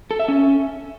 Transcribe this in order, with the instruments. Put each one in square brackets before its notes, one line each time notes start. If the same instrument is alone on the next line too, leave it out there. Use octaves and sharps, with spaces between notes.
[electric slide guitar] A4
E5
C#4